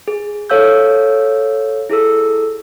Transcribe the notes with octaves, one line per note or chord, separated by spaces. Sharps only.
G#4
A4 C#5 F5 E6 G6
E4 G#4 A4 E6